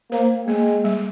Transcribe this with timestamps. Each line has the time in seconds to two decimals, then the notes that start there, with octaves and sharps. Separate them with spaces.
0.11 A#3 C5
0.30 A#3
0.47 G#3 A#3
0.66 A#3
0.84 G3